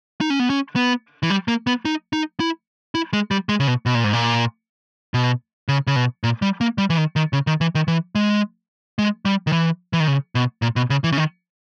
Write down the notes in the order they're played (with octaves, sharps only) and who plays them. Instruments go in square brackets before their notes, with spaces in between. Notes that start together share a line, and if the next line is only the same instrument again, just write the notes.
[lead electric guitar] D#4
C#4
B3
C#4
B3
E3
G3
A#3
B3
D#4
D#4
E4
E4
G#3
G3
G#3
C#3
B2
B2
A#2
G#2
A#2
B2
C#3
C#3
B2
A#2
G3
A#3
G3
E3
D#3
D#3
C#3
D#3
E3
D#3
E3
G#3
G#3
G3
D#3
E3
E3
D#3
C#3
B2
A#2
B2
C#3
E3
C#3
D#3